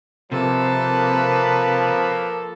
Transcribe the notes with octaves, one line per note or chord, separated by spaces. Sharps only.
C3 F3 A#3 A4 B4